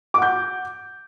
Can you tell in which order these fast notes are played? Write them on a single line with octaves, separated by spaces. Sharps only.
D6 F#5 G6